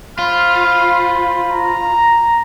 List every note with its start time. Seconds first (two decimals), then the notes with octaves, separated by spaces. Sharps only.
0.19 F4 C5 B5 F6
1.50 A#5